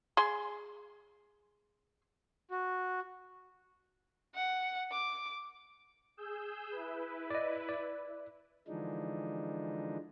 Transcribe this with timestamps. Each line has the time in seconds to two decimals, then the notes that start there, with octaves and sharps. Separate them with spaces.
0.17 G#4 C6
2.51 F#4
4.35 F#5
4.92 D6
6.17 G#4 E6 G6
6.72 E4 B4
7.30 D5 D#5
7.69 D5
8.68 D3 E3 F3 G#3 D4 D#4